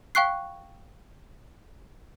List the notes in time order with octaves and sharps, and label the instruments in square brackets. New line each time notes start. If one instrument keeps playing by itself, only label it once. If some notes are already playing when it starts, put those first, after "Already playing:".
[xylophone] F5 G5 C#6 F#6 C7